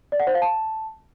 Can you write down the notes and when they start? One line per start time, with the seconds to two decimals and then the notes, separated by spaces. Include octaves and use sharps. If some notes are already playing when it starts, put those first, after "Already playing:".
0.12 D5
0.20 F#5
0.27 C5
0.34 F5
0.42 A5